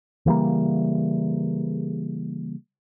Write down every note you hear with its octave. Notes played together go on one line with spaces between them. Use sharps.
C#3 E3 G3 A#3